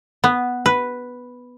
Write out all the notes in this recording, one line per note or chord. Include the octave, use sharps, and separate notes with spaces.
B3
B4